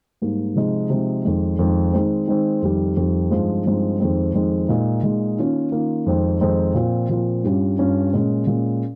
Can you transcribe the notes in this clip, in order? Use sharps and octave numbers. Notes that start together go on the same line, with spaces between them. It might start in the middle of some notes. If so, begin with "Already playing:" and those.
G#2 G3 A#3
C3 F3 G#3 D#4
C3 F3 G#3 D#4
F2 D#3 G#3
F2 D#3 G#3
D#3 G#3 C4
D#3 G#3 C4
F2 D#3 G3
F2 D#3 G3
G2 F3 G#3 C4 D#4
G2 F3 G#3 C4 D#4
F2 D#3 G#3 C4
F2 D#3 G#3 C4
A#2 G#3 D#4
A#2 G#3 D#4
D#3 A#3 C#4 F4
D#3 A#3 C#4 F4
F2 D#3 G#3 C4 D#4
F2 D#3 G#3 C4 D#4
A#2 F3 C4 F4
A#2 F3 C4 F4
G2 G3 C#4 F4
G2 G3 C#4 F4
A#2 G#3 C#4
A#2 G#3 C#4